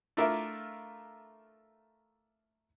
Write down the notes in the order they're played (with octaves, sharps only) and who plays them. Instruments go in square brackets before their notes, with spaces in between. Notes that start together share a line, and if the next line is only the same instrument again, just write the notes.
[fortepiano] A3 D4 E4 F4 A#4 E5